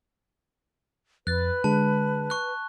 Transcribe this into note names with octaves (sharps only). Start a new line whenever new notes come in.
F2 B4 F#6 A6
D3 G#3 A5
C#6 F#6